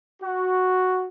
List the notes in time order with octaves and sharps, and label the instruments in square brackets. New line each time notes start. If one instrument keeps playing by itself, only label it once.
[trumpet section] F#4